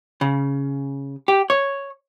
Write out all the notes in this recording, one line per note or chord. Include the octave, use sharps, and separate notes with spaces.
C#3
G4
C#5